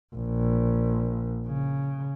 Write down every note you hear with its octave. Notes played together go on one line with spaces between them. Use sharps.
A#1
C#3